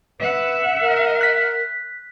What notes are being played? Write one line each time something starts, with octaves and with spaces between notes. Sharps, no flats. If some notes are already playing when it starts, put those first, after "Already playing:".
B4 E5 F#5
A#4
F#6 B6